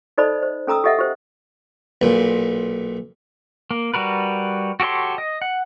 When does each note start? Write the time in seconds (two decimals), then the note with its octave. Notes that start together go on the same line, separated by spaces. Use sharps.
0.18 D#4 A4 C5 D5 D#5 B5
0.43 C5
0.67 C#4 A4 A#5 D#6 E6
0.84 G4 A4 D#5 E5 F#5
0.98 G4 C5
2.02 B1 A#2
3.71 A#3
3.94 G3 F#4 A#4 B4
4.80 F#4 G4 A4 C#5 C6
5.18 D#5
5.42 F#5